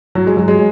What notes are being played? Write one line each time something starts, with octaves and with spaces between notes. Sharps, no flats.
F#3
G#3
F#3
G#3